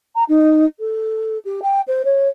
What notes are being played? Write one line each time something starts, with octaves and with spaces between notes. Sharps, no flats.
A#5
D#4
A4
G4
G5
C5
C#5